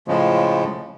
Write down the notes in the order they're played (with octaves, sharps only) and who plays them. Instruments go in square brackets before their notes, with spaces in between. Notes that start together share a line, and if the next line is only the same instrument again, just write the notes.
[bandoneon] A2 C#3 F3 G#3